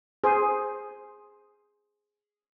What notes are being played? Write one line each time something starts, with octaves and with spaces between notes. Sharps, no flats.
G#4 C5